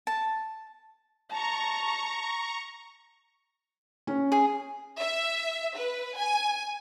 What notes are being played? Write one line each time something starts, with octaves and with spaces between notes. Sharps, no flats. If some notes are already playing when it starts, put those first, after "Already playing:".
A5
A5 A#5 C#6
C#4
G#4
E5
B4
G#5